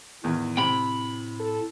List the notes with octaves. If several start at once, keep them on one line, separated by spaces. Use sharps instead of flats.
E2 A2 D#3
C3 G5 B5
A4